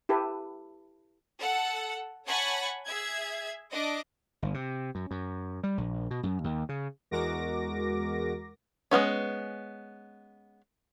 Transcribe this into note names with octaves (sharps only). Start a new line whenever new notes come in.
E4 G4 A4 B4
A4 F#5
C#5 F#5 G#5 A5 B5 C#6
G#4 E5 G#6
D4 D#5 D6
G1
C3
F#2
F#2
G3
A#1
B2
F#2
D#2
C#3
E2 G#3 F#4 A#4 D6 A#6
G#3 A3 B3 C#4